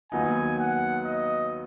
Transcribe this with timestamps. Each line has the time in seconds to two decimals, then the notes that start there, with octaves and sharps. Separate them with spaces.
0.12 D#2 D#3 F#3 B3 D#4 G#5
0.58 F#5
1.05 D#5